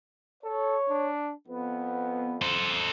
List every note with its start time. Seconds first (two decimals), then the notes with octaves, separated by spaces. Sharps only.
0.44 A4 C#5
0.89 D4
1.48 F2 B3
2.42 A4 C5